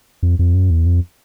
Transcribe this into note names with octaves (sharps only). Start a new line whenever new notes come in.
F2
F2
F#2
E2
F2